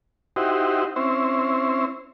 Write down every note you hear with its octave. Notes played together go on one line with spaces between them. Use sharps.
D#4 E4 F#4 G4 C5
C4 C#4 E4 C5